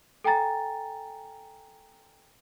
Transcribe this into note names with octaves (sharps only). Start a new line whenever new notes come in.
A4 G5 G#5 A#5 A6